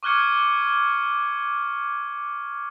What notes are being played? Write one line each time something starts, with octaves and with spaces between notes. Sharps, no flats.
C#6 D6 F6 F#6 G#6 C#7